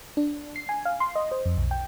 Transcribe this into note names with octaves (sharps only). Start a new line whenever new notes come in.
D4
C7
G#5
F5
C6
D#5
C5
F2
B1
G5